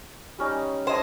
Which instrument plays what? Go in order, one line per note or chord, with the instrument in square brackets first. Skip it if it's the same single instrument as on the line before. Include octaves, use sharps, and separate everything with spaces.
[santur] G3 C#4 D#4
[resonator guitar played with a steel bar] C5 D#5 [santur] G#5 A5